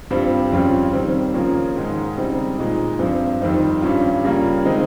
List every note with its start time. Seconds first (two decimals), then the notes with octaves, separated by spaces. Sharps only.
0.10 G2 G3 C4 F4
0.52 F2 C#3 G3 C#4 F4
0.93 D#3 G3 C4
1.34 C#3 F3 A#3 C#4 F4
1.76 G#2 D#3 G#3 D#4
2.17 C#3 G3 C4 D#4
2.58 A#2 G#3 D#4
2.99 G2 F3 C4
3.41 F2 D#3 G3 C4 D#4
3.82 G2 G3 C#4 F4
4.24 C#3 G3 A#3 C#4 F4
4.65 D#3 G#3 C4 D#4